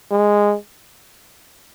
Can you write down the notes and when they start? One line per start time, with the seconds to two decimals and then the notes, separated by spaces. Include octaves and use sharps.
0.11 G#3